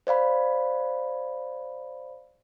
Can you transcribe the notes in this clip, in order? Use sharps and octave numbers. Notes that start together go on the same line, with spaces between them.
C5 D5 F5 B5